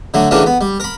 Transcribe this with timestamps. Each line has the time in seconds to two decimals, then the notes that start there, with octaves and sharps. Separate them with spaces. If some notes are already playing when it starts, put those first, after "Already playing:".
0.14 D3 F#3 A3
0.31 C#3 E3 F#3 A3 C#4 D4
0.46 B3
0.61 G3
0.80 A#4 B5